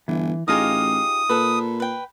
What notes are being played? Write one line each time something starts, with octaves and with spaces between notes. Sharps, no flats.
G1 E3
A1 D#4 F4 G4 G#4 D#5 F5 D#6
A#2 A4 B4
B4 G5